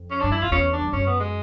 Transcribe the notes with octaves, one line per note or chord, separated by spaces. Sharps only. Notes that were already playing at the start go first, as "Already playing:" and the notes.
Already playing: F2
C#4
D4
G2
F#2 E4
F2 F4
E2 C#4
D4
G2
F#2 C#4
B3
G#3